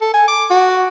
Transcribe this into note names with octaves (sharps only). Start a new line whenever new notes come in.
A4
G#5
D6
F#4